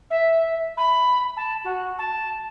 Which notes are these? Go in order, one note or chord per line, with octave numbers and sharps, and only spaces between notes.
E5
B5
A5
F#4
A5